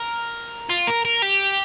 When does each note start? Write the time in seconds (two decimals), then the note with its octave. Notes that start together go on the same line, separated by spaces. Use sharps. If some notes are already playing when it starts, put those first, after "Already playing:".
Already playing: A#4
0.70 F4
0.87 A#4
1.05 A#4
1.22 G4